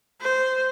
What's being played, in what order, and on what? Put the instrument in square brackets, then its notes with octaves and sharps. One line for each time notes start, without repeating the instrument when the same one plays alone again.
[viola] C5